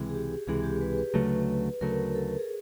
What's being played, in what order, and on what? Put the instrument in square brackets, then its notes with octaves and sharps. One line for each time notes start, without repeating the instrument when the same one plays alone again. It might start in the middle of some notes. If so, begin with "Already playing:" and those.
Already playing: [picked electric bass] C#2 C3 E3 G#3
[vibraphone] G#4
G4
[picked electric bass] C#2 C3 E3 G#3 [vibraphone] G#4
[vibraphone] G4
B4
B4
[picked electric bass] D2 C#3 F#3 A3
[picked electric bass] D2 C#3 F#3 A3 [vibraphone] A#4
[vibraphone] A4
G#4